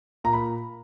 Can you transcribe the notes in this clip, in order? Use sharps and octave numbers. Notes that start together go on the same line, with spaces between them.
A#2 A#5
B5